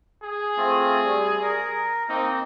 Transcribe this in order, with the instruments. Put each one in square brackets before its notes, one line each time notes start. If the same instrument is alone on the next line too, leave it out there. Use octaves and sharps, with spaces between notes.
[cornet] G#4
[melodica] A3 C4 F4
G3
A#4
[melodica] A#3 C4 [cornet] D#4